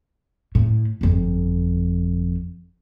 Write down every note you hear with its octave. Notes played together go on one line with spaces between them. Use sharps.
A2
G1 F2